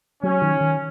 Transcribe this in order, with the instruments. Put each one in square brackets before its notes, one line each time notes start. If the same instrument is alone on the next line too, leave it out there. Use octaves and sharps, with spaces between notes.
[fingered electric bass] F#3 [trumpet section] C#4
[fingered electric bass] D#3
D#3